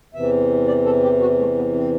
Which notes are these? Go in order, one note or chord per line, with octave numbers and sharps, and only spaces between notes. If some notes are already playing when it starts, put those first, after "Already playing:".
E2 C3 E3 E5
D5
A4
G4
F#4
A3
B3
C4